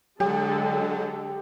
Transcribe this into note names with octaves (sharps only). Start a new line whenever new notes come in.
D3 F#3 G#3 G4 A4